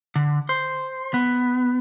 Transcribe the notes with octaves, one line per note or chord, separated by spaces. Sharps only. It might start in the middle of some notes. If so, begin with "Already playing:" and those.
D3
C5
B3